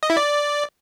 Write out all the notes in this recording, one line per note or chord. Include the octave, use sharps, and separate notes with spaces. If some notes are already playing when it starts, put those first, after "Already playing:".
D#5
E4
D5